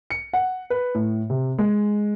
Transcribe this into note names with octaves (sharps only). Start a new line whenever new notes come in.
C#7
F#5
B4
A2
C3
G#3